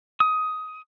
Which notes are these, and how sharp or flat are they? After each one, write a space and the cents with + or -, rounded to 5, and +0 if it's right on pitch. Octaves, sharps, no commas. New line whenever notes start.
D#6 +15